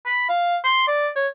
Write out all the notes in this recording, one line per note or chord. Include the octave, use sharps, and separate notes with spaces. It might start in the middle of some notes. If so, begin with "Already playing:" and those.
B5
F5
C6
D5
C#5